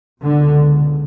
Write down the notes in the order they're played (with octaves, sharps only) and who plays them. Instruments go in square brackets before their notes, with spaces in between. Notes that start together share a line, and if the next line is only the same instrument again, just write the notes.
[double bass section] C#2 B2 D3